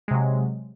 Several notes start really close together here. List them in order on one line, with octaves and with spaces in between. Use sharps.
G#3 C3 F#3